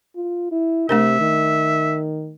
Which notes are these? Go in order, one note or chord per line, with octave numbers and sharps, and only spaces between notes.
F4
E4
C3 A3 D4 A#4 E5
D#3